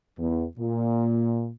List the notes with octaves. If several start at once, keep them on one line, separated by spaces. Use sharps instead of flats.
E2
A#2